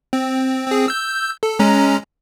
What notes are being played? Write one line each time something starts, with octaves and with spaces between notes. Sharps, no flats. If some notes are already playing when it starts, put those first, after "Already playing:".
C4
C4 G#4
E6 G6
A4
G#3 C#4 A#5